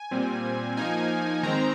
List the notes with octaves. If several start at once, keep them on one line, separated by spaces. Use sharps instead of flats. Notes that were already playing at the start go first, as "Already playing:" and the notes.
Already playing: G#5
A#2 G3 C4
F3 A#3 D#4 G#5
D#3 G#3 C4 A#5